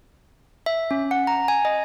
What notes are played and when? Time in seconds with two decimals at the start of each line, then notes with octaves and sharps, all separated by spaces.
0.66 E5
0.91 C#4
1.11 F#5
1.27 A#5
1.48 G#5
1.65 D#5